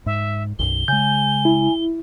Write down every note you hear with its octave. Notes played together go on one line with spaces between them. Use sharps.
G#2 E5
B1 F#2 G7
C#3 G#3 G#5 G6
E4